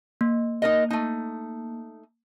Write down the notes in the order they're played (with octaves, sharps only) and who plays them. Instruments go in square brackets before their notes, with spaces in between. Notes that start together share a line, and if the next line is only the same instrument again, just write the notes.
[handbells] A#3
[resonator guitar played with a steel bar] D#4 A#4 D#5
A3 D#4